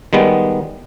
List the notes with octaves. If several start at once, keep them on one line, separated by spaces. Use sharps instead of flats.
D#3 G3 G#3 B3